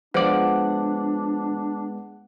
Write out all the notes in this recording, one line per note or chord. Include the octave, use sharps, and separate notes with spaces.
F3 G#3 B3 D4 D5 F#5